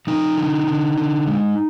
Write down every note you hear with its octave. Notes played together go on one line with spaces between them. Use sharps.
F3 D#4
D3
D3
D3
G#3